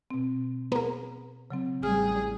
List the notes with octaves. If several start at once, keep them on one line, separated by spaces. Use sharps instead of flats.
B2 C4
B3 G#4 A#4 A#5
C#3 F#3 C4
A1 G3 G#4 F6